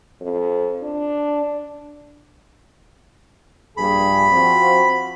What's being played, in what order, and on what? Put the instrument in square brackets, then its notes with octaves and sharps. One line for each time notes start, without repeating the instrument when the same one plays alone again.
[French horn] F2
D4
[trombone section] A#1 G2 G#4 [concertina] B5
[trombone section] F3 C4 F#4